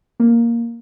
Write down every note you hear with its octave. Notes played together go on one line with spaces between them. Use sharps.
A#3